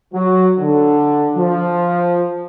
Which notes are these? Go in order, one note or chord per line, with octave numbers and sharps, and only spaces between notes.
F#3
D3
F3